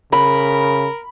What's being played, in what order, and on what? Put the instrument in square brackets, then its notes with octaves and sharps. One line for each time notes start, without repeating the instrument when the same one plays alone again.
[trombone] C#3 [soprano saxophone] A#4 [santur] B5